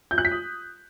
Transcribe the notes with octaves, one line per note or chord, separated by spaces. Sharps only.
G6
F#6
B6
D#6